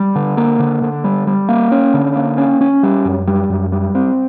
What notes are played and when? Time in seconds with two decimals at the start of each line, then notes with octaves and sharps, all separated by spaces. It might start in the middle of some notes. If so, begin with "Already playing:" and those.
Already playing: G3
0.16 D3
0.37 A#3
0.60 D3
0.82 D3
1.04 G3
1.27 G3
1.49 A#3
1.72 C#4
1.94 D3
2.16 A#3
2.38 C#4
2.61 C#4
2.83 G3
3.05 F#2
3.27 G3
3.50 F#2
3.72 G3
3.95 C4